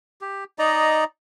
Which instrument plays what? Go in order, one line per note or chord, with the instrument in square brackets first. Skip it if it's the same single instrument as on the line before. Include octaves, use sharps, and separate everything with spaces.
[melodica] G4
D#4 D5 D#5 A#5